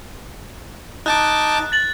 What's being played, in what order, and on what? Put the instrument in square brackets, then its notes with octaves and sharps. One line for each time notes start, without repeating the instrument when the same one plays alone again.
[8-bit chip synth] D#4 A5 D6 [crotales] F#6
[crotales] A6 F#7